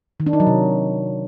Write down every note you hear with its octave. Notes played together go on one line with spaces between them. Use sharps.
D#3
D4
D#4
F#3
C3